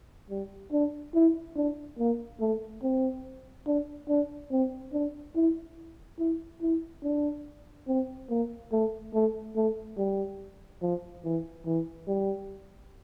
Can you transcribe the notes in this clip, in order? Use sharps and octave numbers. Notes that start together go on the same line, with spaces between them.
G3
D4
E4
D4
A#3
A3
C4
D4
D4
C4
D4
E4
E4
E4
D4
C4
A#3
A3
A3
A3
G3
F3
E3
E3
G3